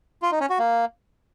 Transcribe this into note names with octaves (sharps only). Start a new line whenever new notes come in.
F4
D#4
C#4
F#4
A#3